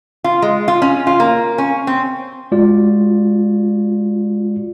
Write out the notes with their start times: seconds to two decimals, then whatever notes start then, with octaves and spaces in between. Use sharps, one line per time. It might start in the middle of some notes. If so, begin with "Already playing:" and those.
0.24 F4
0.42 G#3
0.68 F4
0.82 C#4
1.07 F4
1.20 A#3
1.58 C#4
1.87 C4
2.52 G#3 F4 F#4 D5